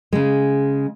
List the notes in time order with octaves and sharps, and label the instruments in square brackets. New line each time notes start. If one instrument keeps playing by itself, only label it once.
[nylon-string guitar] C#3 G#3